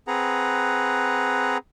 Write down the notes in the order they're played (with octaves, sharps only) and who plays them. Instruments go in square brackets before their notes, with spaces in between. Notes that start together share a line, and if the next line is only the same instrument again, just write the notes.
[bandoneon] C4 G#4 B4 F#5 A#5